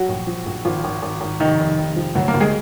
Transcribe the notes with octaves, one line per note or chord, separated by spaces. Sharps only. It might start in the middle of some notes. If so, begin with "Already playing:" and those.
Already playing: F#3 F#4
A#1
F3
A#1
G#1 F3 F4
G#1
G#1
G#1
F1 D#3 D#4
F1
F1
F3
D2 F#3 F#4
A#3 A#4
D2
G#3 G#4